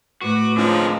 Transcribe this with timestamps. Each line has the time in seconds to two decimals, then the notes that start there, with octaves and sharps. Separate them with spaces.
0.22 A2 F#4 B4 D6
0.57 D3 F3 G#3 C4 C#4 D#4 F4